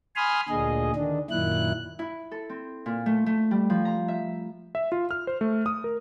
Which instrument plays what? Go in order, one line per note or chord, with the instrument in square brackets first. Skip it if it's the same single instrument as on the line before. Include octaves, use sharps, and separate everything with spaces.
[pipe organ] G#5 B5 C6 D#6 F6
D2 A#2 D3 G#4 D#5
D3 D#3 D4
F#2 A#2 D#3 E4 F#6
[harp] E4
A4
C4
A#2
A3
A3
G3
F3
A#5
E5
[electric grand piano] E5
F4
F6
C5
A3
D#6
A#4